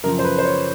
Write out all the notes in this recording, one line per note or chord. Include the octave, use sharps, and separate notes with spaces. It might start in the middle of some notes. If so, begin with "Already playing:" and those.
F#2 C#3 F3 A#4
C5
B4
C5
C#5